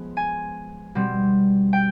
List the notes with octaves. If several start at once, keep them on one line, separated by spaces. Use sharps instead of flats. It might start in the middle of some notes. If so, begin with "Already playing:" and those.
Already playing: F3 G#3 B3
G#5
B2 G3 C4
G5